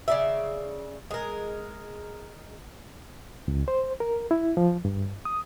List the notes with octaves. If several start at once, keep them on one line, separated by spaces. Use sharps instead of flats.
C#3 D5 E5
G#3 A#4
C#2
C5
A#4
E4
F3
G2
D#6